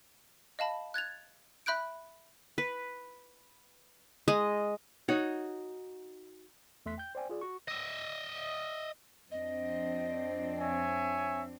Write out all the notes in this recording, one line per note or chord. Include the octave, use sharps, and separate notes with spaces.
D#5 F5 A5 B5
F#6 G#6 A6 F7
E5 B5 F#6 G6 D7
B4
G#3 D#5
D#4 F#4 C#5 F#5
E2 A3 E5 C6 F#6 B6
G5 G6
C5 D5 G5 G#5
F4 G#4 D5
F#4 C#6
D#5 E5
F2 C4 D4 D#5
C#5 E5 G#5